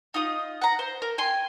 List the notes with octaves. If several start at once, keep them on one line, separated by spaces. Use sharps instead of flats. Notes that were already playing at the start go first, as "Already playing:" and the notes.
D#4 F4 D#6
F#5 A#5
C5
A#4
G5 G#5 C6